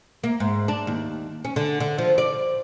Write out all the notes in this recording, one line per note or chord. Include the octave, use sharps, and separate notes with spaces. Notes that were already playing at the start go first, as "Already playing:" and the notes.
A#3
G#2
D4
D#2
C#4
D3
D3
F3
D5